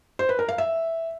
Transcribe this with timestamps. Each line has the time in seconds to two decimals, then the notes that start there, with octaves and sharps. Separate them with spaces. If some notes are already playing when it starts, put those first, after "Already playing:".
0.19 C5
0.29 B4
0.39 A#4
0.49 F5
0.58 E5